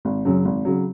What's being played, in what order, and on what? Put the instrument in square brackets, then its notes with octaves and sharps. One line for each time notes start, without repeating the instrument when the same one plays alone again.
[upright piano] G#1
F#2 C#3 F#3
G#1
C#3 F#3